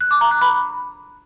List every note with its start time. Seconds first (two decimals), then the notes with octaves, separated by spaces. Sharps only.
0.01 F#6
0.11 D6
0.21 A#5
0.31 F#6
0.41 B5